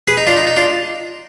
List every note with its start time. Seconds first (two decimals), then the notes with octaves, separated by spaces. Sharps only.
0.08 G#4 B4
0.17 D#4
0.27 D4 F4
0.37 D#4
0.47 D#4
0.56 D4 F4